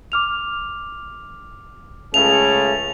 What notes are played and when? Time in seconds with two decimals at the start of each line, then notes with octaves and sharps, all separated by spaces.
0.12 D6 F6 F7
2.14 C#2 C#3 A3 A4 F7